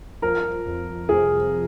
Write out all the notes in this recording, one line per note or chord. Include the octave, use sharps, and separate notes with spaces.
F3 A#4
F2
C3 G#4